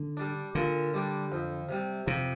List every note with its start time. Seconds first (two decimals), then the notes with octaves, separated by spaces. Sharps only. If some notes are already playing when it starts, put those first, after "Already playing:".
Already playing: D3
0.17 G3 D4
0.55 A#2 D3
0.94 G3 D4
1.32 F2
1.69 C3 G3
2.07 F2 C3